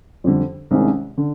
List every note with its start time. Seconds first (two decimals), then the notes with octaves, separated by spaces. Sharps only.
0.24 F2 D3 G3
0.71 C2 C3 D#3 G#3 C#4
1.18 D3